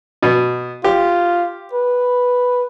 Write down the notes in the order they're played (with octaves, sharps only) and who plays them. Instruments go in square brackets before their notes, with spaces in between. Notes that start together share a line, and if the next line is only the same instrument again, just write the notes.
[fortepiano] B2
[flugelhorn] F4 [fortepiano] G4
[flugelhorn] B4